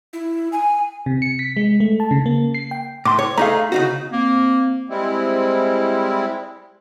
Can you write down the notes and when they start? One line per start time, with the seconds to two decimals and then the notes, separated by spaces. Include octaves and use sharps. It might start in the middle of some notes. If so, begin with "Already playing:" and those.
0.13 E4
0.52 G#5
1.06 C3
1.22 C#7
1.39 B6
1.57 G#3
1.80 A3
2.00 A5
2.11 C#3
2.26 A#3
2.54 C7
2.71 G5
3.05 A2 C6 D6
3.19 C#5
3.38 A3 D#4 G#4 F5 A#5
3.72 C#3 D#4 F#4
4.12 A#3 C4
4.89 G3 G#3 C4 E4